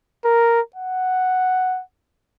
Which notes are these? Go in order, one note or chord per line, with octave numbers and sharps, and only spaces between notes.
A#4
F#5